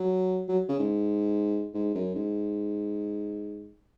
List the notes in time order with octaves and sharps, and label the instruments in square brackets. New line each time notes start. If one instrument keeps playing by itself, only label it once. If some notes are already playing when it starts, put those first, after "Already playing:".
Already playing: [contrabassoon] F#3
F#3
C#3
G#2
G#2
F#2
G#2